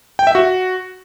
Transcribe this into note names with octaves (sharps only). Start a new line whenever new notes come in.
G5
E5
F#4